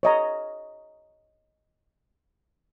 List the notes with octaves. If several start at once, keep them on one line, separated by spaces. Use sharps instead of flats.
C#5 D#5 A#5